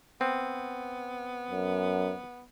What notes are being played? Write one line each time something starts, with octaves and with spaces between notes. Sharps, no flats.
B3 C4
F#2